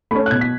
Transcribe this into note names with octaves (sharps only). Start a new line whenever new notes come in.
A3 C#4 B5
F#6
B2 G#6
B6